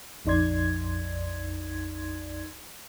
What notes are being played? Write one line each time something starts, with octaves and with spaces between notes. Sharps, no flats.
A#1 F2 D#4 D5 C6 G#6